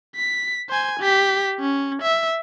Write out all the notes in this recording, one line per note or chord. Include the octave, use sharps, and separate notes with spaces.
B6
C5 G#5
G4 B6
C#4
E5